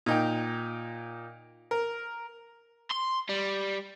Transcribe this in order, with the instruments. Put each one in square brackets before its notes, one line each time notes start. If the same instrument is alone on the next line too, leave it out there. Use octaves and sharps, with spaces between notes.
[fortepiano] A#2 D#4 G5
A#4
[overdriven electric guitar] C6
G3